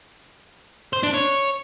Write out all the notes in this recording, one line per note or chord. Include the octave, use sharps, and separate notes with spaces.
C5
D4
C#5